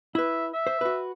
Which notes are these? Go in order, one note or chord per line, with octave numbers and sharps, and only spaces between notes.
E4 B4 E5
E5
C5
F#4 B4